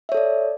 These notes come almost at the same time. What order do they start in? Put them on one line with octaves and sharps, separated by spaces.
E5 C#5 A4 D5